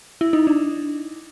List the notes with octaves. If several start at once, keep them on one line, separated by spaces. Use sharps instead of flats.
E4
D#4
D4